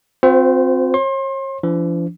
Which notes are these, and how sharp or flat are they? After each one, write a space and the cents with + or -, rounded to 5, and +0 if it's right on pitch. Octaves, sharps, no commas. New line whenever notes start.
C4 +0 F4 +45 C5 -30
C#5 -40 C6 +30
F3 -45 D4 -25